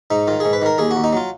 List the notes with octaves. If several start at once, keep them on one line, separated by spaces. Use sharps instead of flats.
G#2 D#4
D#3 F4
G#2 G#4
B4
D#3 A#4
D#2 G#4
F#4
D#2
D#4
F#3 F4